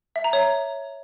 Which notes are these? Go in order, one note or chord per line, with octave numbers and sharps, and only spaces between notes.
E5
A#5
C#5